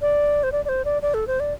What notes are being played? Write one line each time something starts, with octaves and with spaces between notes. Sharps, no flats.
D5
C5
D5
D5
C5
D5
D5
A4
C5
D5